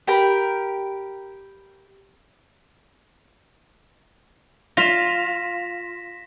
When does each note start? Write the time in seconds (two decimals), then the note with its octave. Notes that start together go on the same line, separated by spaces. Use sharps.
0.07 G4 A#4 B5
4.77 F4 A#6 B6 E7